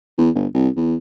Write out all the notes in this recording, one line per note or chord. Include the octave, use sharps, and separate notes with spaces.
E2
G1
C2
E2